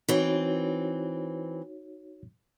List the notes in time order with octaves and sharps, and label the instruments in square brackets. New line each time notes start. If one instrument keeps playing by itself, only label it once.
[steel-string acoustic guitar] E3 C4 [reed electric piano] D#4 F#4 C#5